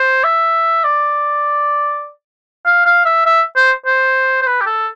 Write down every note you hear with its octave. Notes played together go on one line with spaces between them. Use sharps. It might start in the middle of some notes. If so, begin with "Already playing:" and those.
Already playing: C5
E5
D5
F5
F5
E5
E5
C5
C5
C5
B4
G4
A4